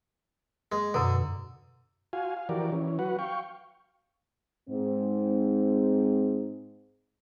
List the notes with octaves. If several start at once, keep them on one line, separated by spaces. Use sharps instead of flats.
G#3
F#2 B2 D3
F4 F#4 F5 G#5
F5
E3 F3 F#4 G4 A#4 D5
E3 C#4
F#3 F#4 B4 F#5
F5 G5 C#6
G#2 C4